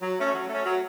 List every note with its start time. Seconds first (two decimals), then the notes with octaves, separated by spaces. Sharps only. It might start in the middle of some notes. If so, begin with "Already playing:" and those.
0.02 F#3
0.18 A3 C#4
0.34 F#3
0.50 A3 C#4
0.65 F#3